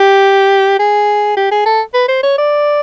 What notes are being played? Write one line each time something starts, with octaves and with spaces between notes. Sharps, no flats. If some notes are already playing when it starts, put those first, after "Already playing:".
Already playing: G4
G#4
G4
G#4
A4
B4
C5
C#5
D5